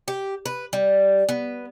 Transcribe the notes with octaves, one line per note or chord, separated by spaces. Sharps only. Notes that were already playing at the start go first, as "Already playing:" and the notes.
G4
B4
G3
B3